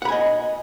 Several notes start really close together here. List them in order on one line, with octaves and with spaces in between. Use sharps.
F#5 B5 G#5 D#5